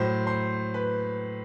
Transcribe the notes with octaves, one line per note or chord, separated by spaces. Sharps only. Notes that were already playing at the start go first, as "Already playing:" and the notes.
Already playing: A2 F#3 C5 C6
C5 C6
B4 B5